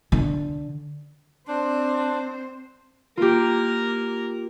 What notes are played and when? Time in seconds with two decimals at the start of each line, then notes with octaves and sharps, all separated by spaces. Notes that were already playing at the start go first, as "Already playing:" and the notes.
0.12 D3
1.48 C4 D4 C5
3.17 A#3 F4 G4 A#4